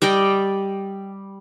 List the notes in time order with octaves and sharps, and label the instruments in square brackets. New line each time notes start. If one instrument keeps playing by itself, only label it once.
[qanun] G3 D5 D#5 G5